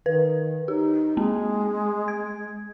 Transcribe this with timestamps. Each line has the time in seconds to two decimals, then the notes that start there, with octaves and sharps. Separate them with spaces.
0.06 D#3 B4
0.68 D#4 G4
1.17 G#3 A#3 C4
2.08 G#6